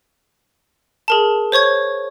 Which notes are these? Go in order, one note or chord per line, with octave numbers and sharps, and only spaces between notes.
G#4 A#4 A5
C5 C#5 C#6 G#6